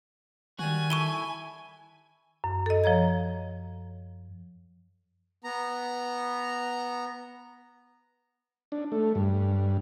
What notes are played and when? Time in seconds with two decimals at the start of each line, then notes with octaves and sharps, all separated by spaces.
0.59 D#3 G3 F#4 G#5
0.90 E4 A4 C#6 D#7 G7
2.44 F#2
2.66 A4 D#5
2.84 F3 C#5 A#5 G#6
5.44 B3 A#5
8.72 D4
8.92 A3
9.15 G2